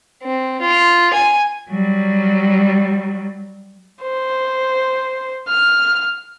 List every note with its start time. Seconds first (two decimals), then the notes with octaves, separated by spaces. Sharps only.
0.23 C4
0.61 F4
1.13 G#5
1.70 F#3 G3
4.02 C5
5.48 F6